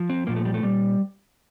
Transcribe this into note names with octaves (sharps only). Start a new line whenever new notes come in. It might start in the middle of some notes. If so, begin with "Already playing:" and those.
Already playing: F3
C4
A#2 F3 A#3
A3
G3
A3
A#2 G3